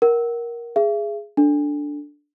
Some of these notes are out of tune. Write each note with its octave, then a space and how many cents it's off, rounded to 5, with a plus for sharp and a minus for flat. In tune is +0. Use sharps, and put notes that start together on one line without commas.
A#4 +15 F#5 +25
G#4 +0 E5 +40
D4 +0 A4 +5